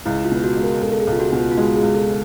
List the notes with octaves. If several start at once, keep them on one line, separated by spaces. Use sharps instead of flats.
C#2 E4
F4
B2
F#4
G#3
A#4
C#2 A4
A4
G#4
C#2
F4
F#4
B2
F4
F4
G#3 F#4
G#4
C#2
A4